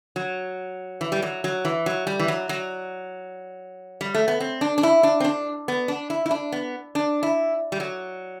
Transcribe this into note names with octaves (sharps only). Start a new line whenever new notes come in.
F#3
E3
G3
F#3
F#3
E3
F#3
G3
E3
F#3
F#3
G3
A3
B3
C4
D4
D4
E4
D4
C4
D4
B3
D4
E4
E4
D4
B3
D4
E4
G3
F#3